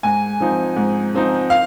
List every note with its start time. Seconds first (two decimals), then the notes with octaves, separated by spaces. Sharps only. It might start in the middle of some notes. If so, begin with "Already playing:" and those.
0.03 G#2 G#5
0.40 F3 C4 D#4
0.76 G#2
1.14 F3 C4 D#4
1.50 F5